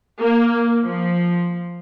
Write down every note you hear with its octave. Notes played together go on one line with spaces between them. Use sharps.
A#3
F3